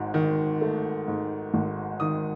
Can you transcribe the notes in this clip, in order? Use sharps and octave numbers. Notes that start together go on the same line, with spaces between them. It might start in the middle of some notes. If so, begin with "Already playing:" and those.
Already playing: G#1 G#2
D#3
A3
G#2
G#1
D#3 D#6